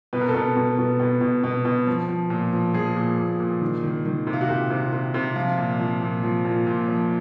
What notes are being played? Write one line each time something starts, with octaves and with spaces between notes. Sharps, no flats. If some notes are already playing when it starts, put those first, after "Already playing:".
B2 B4
A#4
A4
B2 A#4
B2
B2
B2
B2
B2
B2
F3
F3
A#2
F3
F3 G#4
A#2
A#2
A#2
D#3
D#3
D#3
C3
F4
F#4
C3 G4
C3
C3
C3
F3 F4
A#2
F3
A#2
F3
A#2
A#2
F3